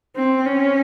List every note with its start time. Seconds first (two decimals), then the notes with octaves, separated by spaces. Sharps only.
0.16 C4
0.47 C#4